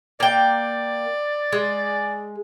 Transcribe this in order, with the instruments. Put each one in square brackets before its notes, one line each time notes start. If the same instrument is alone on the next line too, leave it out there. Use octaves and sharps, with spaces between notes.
[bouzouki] A#3 G5 [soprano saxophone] D5
[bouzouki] G#3